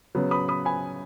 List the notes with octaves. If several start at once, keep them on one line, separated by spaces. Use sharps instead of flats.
C#3 F#3 B3
B5 D#6
B5 D#6
G#5 B5